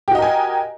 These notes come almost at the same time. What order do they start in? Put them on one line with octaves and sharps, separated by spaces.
G4 F#4 D#5 A#4 G#5